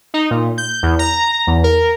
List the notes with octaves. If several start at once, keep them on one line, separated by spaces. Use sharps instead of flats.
D#4
A#2
G6
E2
A#5
E2
A#4